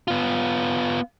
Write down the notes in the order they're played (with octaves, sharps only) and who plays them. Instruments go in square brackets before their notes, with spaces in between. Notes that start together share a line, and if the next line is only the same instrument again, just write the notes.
[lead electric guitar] B3 F4